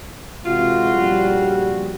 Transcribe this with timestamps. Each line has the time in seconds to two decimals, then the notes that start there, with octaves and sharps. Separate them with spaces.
0.46 C3 E3 G#3 F4 F#4
0.94 A#1 C#3 G3